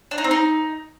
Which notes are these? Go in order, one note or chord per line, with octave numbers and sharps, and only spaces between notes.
D4
D#4
C4
D#4